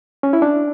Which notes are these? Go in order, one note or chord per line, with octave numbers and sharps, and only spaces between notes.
C#4
E4
D4